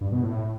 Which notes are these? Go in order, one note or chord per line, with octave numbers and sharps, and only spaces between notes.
G2
B2
A2